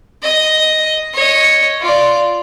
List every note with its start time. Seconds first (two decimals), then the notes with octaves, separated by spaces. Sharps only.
0.23 D#5
1.14 C#5 D#5
1.80 F4 D5